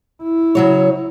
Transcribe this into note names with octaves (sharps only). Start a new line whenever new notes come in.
E4
C#3 F#3 C#5